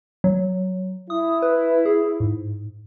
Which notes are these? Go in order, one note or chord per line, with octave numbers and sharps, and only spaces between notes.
F#3
E4 D#6
B4
G#4
G#2